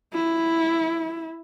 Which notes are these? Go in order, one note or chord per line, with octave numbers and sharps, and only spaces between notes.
E4